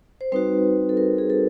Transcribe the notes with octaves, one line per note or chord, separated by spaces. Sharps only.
C5
G3 C4 D#4 F#4 B4
A4
A#4
G#4
A4